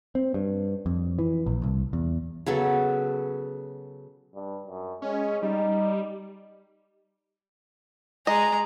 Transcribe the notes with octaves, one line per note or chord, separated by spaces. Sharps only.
C4
G2
F2
E3
A#1
C2
E2
C#3 F#3 B3 A4
G2
F#2
G#3 C#4
G3 D#4
G#3 D#5 A#5